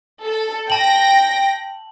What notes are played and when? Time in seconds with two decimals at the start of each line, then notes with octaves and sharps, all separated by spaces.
0.24 A4
0.70 G5 A5 A#6 F#7